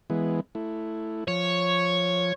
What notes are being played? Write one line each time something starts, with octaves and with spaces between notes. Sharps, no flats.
E3 G#3 B3
A3 E4
F3 C#5